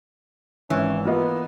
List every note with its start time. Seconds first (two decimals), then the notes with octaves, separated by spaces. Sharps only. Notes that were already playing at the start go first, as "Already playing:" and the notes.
0.70 G#1 E3 C#4
1.05 A#3 B3 F4 D#5